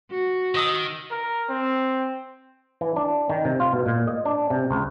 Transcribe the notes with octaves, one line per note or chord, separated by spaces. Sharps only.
F#4
D#3 D#5 D#6 E6
A#4
C4
E3
D4
D#3
C3
F4
B2
A#2
D#5
D4
C3
C#2